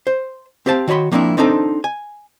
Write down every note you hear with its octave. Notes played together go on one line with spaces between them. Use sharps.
C5
C4 G4 C5 F5 A5
D#3 F#4 C#5 B5 C6
F3 A#3 C4 D4 E4
B3 C4 D4 D#4 A4 C5
G#5